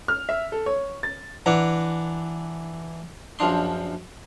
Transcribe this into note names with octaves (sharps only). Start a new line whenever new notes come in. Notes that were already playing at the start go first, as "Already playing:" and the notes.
F6
E5
A4
C#5
A6
E3 D4 F#5 A#5
A#1 F#2 F3 D4 C6